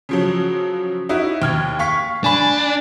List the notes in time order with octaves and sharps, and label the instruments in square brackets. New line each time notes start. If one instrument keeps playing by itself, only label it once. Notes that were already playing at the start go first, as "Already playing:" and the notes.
[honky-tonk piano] C#3 F3 F#3
D#4 E4 F#4
D#2 F6 G#6
F5 C#6 B6
[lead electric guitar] D4 [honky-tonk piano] G#5 B5